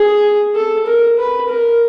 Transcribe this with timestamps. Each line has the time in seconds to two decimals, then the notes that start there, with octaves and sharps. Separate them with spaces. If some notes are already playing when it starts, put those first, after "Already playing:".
Already playing: G#4
0.56 A4
0.86 A#4
1.18 B4
1.48 A#4